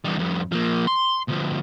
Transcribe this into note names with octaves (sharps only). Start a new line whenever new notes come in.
E2 G3
F2 G3
F3 A#3
C6
D2 F3